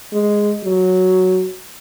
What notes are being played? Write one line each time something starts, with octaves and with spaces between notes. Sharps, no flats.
G#3
F#3